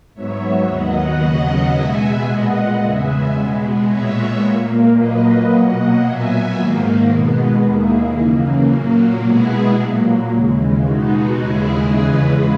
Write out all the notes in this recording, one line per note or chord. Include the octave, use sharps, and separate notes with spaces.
G#2 F#3 B3 C#5 E5
D#2 D#3 F#3 B3 D#5 F#5
D#2 C#3 F#3 B3 D#5 F#5
B2 G#3 B3 E5 G#5
A#2 G#3 B3 D#5 F#5
E2 C#3 G#3 B3 E5 G#5
B2 G#3 B3
A#2 G#3 B3 C#5 E5
A#2 A#3
A#2 F#3 A#3 B4 D#5
B2 F#3 A#3 D#5 F#5
A#2 F#3 B3 E5 G#5
G#2 D#3 A#3
B2 G#3 B3
D#2 D#3 A#3 E4 G#4
F#2 C#3 E3 A#3
A#2 F#3 A#3
B2 G#3 B3 E4 G#4
A#2 F#3 A#3
D#2 C#3 E3 G#3
B2 G#3 B3 D#4 F#4
D#2 C#3 G#3 E4 G#4
E2 C#3 E3 G#3 G#4 B4